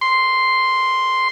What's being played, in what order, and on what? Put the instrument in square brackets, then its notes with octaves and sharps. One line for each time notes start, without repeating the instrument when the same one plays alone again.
[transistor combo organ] C6